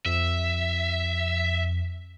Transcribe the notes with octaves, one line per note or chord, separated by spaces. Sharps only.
F2 E5